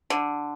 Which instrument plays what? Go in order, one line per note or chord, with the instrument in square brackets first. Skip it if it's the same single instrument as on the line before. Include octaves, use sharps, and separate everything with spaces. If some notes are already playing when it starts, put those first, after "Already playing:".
[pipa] D3